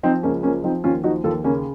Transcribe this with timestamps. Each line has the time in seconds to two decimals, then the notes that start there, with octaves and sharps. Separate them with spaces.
0.03 F3 C4 D#4
0.23 C#2 A#3 C#4
0.43 F3 A#3 C#4
0.64 F3 C4 D#4
0.84 D#2 C#4 F4
1.04 F3 D#4 F#4
1.24 D#2 F4 A4
1.44 C#3 A#3 C#4